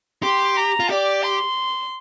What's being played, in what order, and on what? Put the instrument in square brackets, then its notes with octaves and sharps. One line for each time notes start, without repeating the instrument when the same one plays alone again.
[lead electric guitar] G4 [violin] C6
[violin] A#5
[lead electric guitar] F4
[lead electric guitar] G4 [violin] D5
[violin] C6